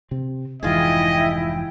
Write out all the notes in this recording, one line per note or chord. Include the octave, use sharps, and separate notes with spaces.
C3 C4
F1 G#2 E3 E4 F4 G#4 D#5 G5